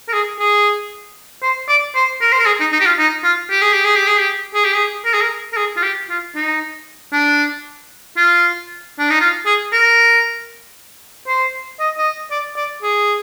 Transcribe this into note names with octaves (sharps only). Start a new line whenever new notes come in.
A#4
G#4
G#4
C5
D5
C5
A#4
C5
A#4
G#4
D#4
D#4
G4
F4
D#4
F4
G4
G#4
G4
G#4
G4
G#4
G4
G#4
G4
G#4
A#4
G#4
A#4
A#4
G#4
F4
G4
F4
D#4
D4
F4
D4
D#4
F4
G#4
A#4
C5
D#5
D#5
D5
D5
G#4